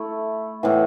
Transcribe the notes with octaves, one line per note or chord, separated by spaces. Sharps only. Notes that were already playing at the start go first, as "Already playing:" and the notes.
Already playing: A3 E4
A2 E3 B3